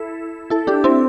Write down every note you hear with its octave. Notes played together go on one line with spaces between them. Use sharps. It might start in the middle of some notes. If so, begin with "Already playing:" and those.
Already playing: E4 A4
E4 A4
D4 G4
C4 E4